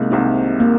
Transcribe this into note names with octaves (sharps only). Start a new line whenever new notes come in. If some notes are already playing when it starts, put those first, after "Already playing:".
Already playing: C2 C3 D#3 G#3 A#3
C2 C3 D#3
A#3